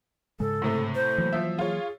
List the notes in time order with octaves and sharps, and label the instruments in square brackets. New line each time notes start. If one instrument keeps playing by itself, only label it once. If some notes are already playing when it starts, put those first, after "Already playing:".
[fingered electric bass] G#2 C#3 G#3 [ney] A4
[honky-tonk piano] A2 C3 A3
[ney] C5
[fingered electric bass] E3 F#3 A#3
[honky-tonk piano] F3 E5
[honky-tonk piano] F4 C#5 [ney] G#4